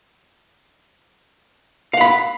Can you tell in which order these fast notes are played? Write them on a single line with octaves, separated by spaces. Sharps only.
F5 F#5 B5